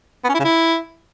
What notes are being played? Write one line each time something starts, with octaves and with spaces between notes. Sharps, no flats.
B3
C#4
E4
C#3
E4